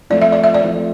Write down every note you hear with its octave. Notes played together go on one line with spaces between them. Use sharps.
F3 A3 C4 F4 D5
E5
D5
E5
D5
F3 A3 C4 F4